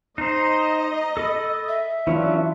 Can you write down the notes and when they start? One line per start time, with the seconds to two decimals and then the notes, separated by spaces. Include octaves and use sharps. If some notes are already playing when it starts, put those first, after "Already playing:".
0.18 D#4 C5 D#5 A#5
1.17 A4 B5
1.68 E5
2.07 E3 F#3 C#4 D4 E4 F4